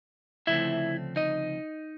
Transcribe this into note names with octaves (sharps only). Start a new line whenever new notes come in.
D2 C#3 F3 A3 C4 E4 E5
D#4 D#5